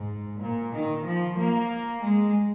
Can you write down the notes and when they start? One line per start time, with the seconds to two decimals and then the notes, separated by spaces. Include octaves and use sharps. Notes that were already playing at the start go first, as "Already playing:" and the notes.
Already playing: G#2
0.40 A#2
0.74 D#3
1.05 F3
1.38 A#3
2.02 G#3